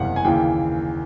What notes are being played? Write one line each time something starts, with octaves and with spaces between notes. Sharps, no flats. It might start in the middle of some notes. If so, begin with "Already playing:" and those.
Already playing: F#1 E2 C3 E3 G3 F5 F#5
G#5
D#2 C#3 E3 G5